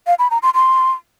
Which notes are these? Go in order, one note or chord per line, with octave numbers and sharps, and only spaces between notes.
F5
B5
A#5
C6
C6